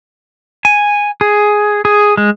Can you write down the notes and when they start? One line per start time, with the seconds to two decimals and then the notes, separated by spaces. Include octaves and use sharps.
0.65 G#5
1.21 G#4
1.85 G#4
2.17 G#3